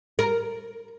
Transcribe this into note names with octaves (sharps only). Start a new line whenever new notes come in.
A#4